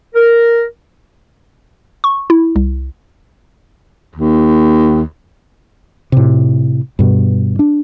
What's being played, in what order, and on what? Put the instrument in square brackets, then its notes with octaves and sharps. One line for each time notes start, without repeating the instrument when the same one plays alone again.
[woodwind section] A#4
[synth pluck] C#6
E4
C2
[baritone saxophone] D#2
[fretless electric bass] A2 C3
G2 B2
D4